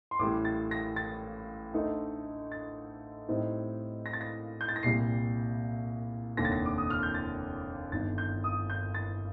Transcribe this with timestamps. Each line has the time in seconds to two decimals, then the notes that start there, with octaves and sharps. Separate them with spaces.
0.11 C6
0.19 A1 A2 G3 D6
0.45 A6
0.71 A#6
0.96 A6
1.74 D2 D3 A3 D#4
2.52 A6
3.29 A2 G3 C4 D#4
4.06 A#6
4.13 A6
4.21 A#6
4.61 G6
4.69 A6
4.76 A#6
4.83 C2 A#2 G3 C7
6.37 F1 D#2 D3 A#6
6.45 A6
6.52 A#6
6.66 D6
6.78 D#6
6.90 F6
7.03 G6
7.14 A6
7.92 G1 G2 D#3 A6
8.18 G6
8.44 D#6
8.70 G6
8.94 A6